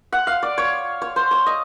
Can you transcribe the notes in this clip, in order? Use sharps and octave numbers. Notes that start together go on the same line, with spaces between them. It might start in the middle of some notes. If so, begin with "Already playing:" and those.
F#5
F5
D5
C#5
C#5
C5
C#5
D#5